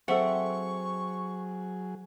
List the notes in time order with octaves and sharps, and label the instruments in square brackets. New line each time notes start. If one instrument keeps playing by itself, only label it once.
[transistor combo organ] F#3 G#4 [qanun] C4 [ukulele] A4 E5 F#5 [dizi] C#6